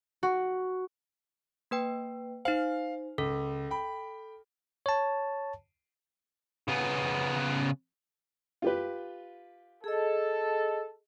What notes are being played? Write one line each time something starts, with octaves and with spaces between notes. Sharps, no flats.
F#4
A#3 B4 G5
D#4 C5 F5
C#2 A4
G5 B5
C#5 A5
C#3 B3
F4 G4 B4
G#4 A4 D#5